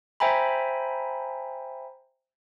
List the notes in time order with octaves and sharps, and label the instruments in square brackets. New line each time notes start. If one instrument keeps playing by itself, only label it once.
[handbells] C5 E5 G5 G#5 A#5 B5